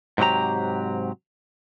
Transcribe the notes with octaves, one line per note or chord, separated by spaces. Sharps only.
G#2 C3 F#3 G4 A#5